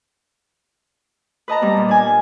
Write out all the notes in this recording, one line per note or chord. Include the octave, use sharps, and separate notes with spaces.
B4 D#5 A5 A#5
G3 B3
A#2
D4 G#5